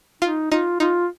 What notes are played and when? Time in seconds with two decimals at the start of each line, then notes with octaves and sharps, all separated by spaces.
0.22 D#4 F4
0.51 D#4 F4
0.80 D#4 F4